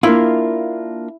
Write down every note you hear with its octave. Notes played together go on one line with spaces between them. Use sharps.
A#3 D4 E4 F4